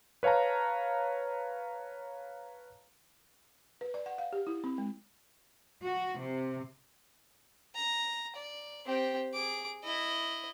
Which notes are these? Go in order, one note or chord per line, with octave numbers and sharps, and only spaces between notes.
B4 C#5 F5 A5 A#5
B4
D5
F#5
F5
G4
E4
C4
G#3
F#4
C3
A#5
D5
C4 G4
G#4 D6
E4 D#5